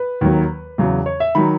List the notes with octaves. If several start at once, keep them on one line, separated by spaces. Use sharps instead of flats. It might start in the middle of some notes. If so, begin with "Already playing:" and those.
Already playing: B4
D#2 D#3 F#3
E2 C#3 F#3
C#5
E5
D#3 F#3 B5